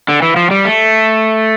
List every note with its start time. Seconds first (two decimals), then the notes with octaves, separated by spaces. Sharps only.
0.08 D3
0.22 E3
0.36 F3
0.51 G3
0.65 A3